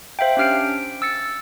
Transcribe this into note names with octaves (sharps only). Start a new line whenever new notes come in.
C5 E5 F5 G5
C#4 D4 G4 F6 C7 D7
D7
E6 A6 C#7